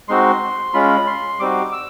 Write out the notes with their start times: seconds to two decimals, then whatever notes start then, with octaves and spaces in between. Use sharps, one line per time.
0.09 G#3 C4 D#4 F#4 C6
0.74 G#3 C#4 F4 B5
1.07 C6
1.40 G3 C4 D#4 F#4 D6
1.72 E6